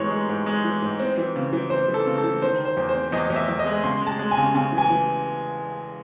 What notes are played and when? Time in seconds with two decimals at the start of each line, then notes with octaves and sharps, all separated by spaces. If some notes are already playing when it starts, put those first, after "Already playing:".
Already playing: G#2 E3 G#3 C#5
0.11 G#3
0.29 G#2
0.46 G#3
0.65 E3
0.82 G#2
1.00 C4
1.18 E3
1.36 C#3
1.53 E3
1.70 E3 C5
1.88 E3
1.94 A4
2.07 C#3
2.18 A4
2.24 E3
2.42 D#3 C5
2.60 D#3
2.65 C5
2.77 E2
2.89 C5
2.94 C4
3.12 E2 D#5
3.30 E2
3.36 E5
3.48 E2
3.59 D#5
3.66 G#3
3.84 C#3 C6
4.01 G#3
4.07 A5
4.19 G#3
4.31 G#5
4.37 C#3
4.55 C#3 G#5
4.72 E3
4.78 G#5
4.90 E3